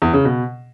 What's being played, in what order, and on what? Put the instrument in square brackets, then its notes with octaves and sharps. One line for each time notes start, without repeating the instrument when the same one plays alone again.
[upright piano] E2
C#3
B2